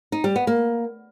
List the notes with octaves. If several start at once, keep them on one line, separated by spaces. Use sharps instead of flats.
D#4
G3
B3
A#3